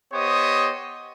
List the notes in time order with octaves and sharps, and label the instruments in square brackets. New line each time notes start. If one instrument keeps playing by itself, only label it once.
[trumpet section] B3 G4 C5 C#5 D#5 D#6